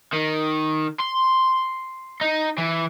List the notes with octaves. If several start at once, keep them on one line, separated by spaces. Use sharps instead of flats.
D#3
C6
D#4
E3